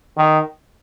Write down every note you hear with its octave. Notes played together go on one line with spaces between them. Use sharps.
D#3